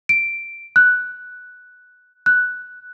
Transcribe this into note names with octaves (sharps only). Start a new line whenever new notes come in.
D7
F#6
F#6